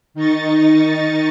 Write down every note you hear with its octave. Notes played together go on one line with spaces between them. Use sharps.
D#3 D#4 D#5 C#6 A6